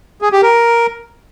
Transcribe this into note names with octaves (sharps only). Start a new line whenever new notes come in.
G#4
G4
A#4